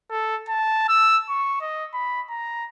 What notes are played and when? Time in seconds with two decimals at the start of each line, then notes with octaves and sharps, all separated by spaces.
0.11 A4
0.49 A5
0.88 E6
1.29 C#6
1.61 D#5
1.94 B5
2.29 A#5